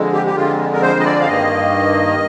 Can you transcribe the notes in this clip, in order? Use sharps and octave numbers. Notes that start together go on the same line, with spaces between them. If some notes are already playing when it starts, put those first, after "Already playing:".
Already playing: F2 D3 G#3
G4
G4
F2 D3 G#3 F4
A#4
C5
D#5
D5
F5
G2 D#3 A#3 D#5